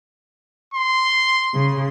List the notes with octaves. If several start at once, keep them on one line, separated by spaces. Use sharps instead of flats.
C6
C#3